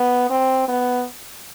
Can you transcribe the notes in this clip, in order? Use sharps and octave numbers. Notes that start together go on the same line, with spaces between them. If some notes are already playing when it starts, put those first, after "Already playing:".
Already playing: B3
C4
B3